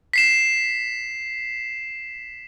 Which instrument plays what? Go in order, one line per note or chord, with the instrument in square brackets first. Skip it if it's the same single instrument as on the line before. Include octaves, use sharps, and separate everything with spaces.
[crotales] B6 C7 E7